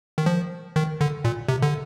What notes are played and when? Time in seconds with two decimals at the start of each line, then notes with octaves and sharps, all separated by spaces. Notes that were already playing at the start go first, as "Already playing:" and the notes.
0.18 D#3
0.26 F3
0.76 D#3
1.01 D3
1.25 A#2
1.48 C3
1.63 D3